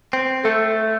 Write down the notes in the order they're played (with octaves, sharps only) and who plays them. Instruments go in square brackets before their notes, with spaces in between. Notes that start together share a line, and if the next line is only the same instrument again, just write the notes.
[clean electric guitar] C4
[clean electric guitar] A3 [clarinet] A4